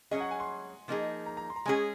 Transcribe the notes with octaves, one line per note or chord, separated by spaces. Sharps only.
F#3 C#4 G#4 D#5
F#5
G#5
C6
F3 A#3 D#4 G#4
A#5
A#5
C6
A#5
G#3 C#4 G#4 G#5